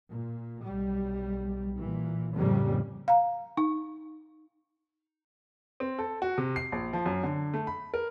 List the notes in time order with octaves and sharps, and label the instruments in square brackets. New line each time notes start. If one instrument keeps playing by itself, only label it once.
[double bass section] A#2
B1 G3
A#2 E3
F2 A2 C#3 G3 A#3
[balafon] F5 A#5
D#4
[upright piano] C4
A4
F#4
C3
C7
A#1
F3
F#2
D3
A3
B5
A#4